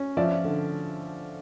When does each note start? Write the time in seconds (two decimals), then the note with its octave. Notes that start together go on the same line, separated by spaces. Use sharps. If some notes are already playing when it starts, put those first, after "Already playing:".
Already playing: C#4
0.17 F3 D5 E5
0.44 D3